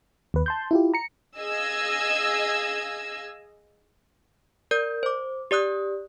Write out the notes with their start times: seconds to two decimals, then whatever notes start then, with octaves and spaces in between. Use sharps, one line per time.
0.34 D#2 B4
0.46 A5 C6 G6
0.71 E4 F4 G4
0.94 A#5 C#7
1.38 G#4 D#5 F5 E6 G#6
4.71 A#4 D5 G6
5.03 C5 D6
5.51 G4 D5 D#6 F#6